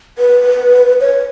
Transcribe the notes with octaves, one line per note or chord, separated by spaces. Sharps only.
B4
C#5